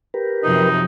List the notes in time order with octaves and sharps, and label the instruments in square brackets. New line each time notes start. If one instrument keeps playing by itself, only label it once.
[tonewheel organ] G4 A#4 B4
[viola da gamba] F#2 C3 F3 [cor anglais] D#4